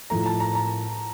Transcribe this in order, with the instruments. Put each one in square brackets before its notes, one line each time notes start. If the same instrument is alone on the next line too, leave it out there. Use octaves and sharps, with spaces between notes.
[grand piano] A2 F3 A3 [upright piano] A#5
[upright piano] A5
A#5
A#5